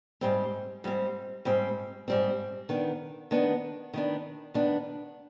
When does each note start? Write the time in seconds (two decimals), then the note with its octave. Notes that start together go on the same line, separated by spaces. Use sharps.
0.21 G#2 G3 C4
0.84 G#2 G3 C4
1.45 G#2 G3 C4
2.08 G#2 G3 C4
2.69 D#3 B3 D4
3.31 D#3 B3 D4
3.94 D#3 B3 D4
4.54 D#3 B3 D4